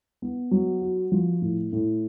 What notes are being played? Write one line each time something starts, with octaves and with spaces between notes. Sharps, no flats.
B3
F#3
F#4
F3
A2
A2